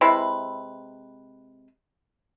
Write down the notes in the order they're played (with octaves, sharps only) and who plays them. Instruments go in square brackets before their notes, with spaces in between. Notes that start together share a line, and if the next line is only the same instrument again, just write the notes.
[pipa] C3 G#3 E4 B4